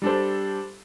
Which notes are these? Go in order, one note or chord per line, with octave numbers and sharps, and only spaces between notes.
G3 D4 A4 C5